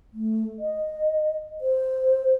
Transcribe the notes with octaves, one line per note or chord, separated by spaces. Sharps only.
A3
D#5
C5